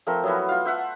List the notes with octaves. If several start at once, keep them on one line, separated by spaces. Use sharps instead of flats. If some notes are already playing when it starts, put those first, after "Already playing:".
F3 A3 C4 A#4
F#3 B3 E4 F#4
F4 F5
C5 E5 F#5